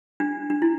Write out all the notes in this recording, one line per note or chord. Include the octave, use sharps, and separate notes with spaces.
D4
D4
E4